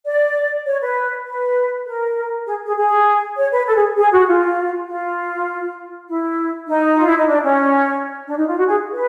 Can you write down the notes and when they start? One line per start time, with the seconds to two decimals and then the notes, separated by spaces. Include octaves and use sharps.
0.06 D5
0.66 C#5
0.82 B4
1.27 B4
1.87 A#4
2.46 G#4
2.66 G#4
2.77 G#4
3.37 C#5
3.51 B4
3.66 A4
3.76 G#4
3.97 G#4
4.12 F#4
4.27 F4
4.87 F4
6.08 E4
6.68 D#4
6.95 F4
7.06 E4
7.17 D#4
7.27 D4
7.43 C#4
8.27 D4
8.37 D#4
8.47 F4
8.57 F#4
8.67 G#4
8.93 B4